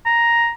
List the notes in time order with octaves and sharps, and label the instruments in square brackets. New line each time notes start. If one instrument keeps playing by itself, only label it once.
[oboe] A#5